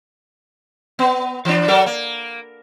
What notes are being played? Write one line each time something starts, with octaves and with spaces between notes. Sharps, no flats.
B3
E3 D4
F#3 A4 A#4
A#3